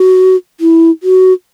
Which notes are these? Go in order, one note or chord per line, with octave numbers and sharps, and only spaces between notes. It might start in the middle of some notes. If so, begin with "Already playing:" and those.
Already playing: F#4
E4
F#4